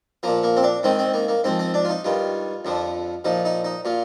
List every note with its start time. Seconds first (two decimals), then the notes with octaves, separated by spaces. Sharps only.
0.23 A#2 F3 A#3
0.44 A#3
0.57 C4
0.63 D4
0.83 G#2 D#3 C4
0.99 C4
1.14 A#3
1.28 A#3
1.44 G#2 F3 C4
1.59 C4
1.74 D4
1.85 F4
1.89 D#4
2.04 G2 D#3 F4
2.65 F2 D3 F3
3.25 A#2 F3 D#4
3.45 D#4
3.65 D#4
3.85 A#2 F4